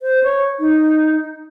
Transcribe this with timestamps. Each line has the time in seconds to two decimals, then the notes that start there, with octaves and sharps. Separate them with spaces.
0.01 C5
0.24 C#5
0.60 D#4